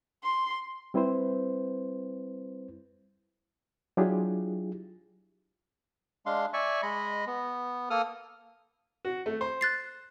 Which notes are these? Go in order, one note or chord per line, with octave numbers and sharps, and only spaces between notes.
C6
G3 C4 E4 B4 C5
F#3 D4 E4 F4 G4 G#4
G#3 D4 F5 C6
D5 E5 G#5 C#6
G#3 D#5 B5
B3
A#3 A4 D#6 F6
F#4
A3
C5
F#6 A6 C7